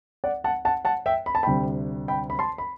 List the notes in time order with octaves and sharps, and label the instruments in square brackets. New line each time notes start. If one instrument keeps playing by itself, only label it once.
[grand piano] D5 F#5
F#5 A5
F#5 A5
F#5 A5
E5 G5
B5
A5
D2 C3 G3 G5 B5
G5 B5
B5
A5 C6
B5